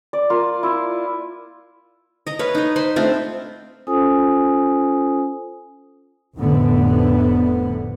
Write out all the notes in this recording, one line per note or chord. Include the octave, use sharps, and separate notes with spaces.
D5
A#3 F4
E4 F4
D#5 A#5
B4 C#5 F5
D#4 D#5
C5 B5 C6
A3 C4 D4 F4
C#4 F4 A4 C5 G#5 D#6
F1 A2 D3 B3